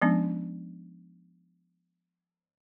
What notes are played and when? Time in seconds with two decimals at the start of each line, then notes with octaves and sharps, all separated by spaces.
0.02 F3 G#3 B3 C#4 D4